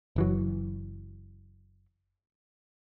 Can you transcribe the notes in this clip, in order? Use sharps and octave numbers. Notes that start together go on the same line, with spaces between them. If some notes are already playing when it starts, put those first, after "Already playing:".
F#1 E3 F#3